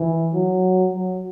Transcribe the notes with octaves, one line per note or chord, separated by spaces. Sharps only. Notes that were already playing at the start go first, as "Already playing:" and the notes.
Already playing: E3
F#3
F#3